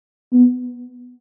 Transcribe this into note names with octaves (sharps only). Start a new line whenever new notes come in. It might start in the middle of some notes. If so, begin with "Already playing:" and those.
B3